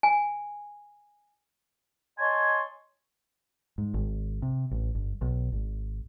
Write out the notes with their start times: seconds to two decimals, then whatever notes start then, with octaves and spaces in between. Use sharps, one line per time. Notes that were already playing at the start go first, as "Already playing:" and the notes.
0.03 G#5
2.19 C#5 D#5 G#5 A5 C6
3.78 G#2
3.94 G#1
4.42 C3
4.71 A1
4.95 G1
5.22 B1
5.52 G#1